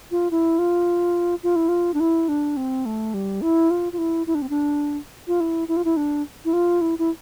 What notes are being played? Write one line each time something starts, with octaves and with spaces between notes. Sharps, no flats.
F4
E4
F4
F4
E4
F4
D4
E4
D4
C4
A3
G3
E4
F4
F4
E4
E4
D4
C4
D4
F4
E4
E4
F4
E4
D4
E4
F4
E4
E4